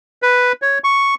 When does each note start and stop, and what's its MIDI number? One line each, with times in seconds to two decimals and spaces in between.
0.22 0.52 71
0.62 0.79 73
0.84 1.15 85